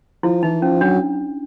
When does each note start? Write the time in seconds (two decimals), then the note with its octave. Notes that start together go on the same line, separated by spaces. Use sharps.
0.23 F3 E4
0.43 E3 D#4
0.62 F3 C#4
0.81 F#3 D4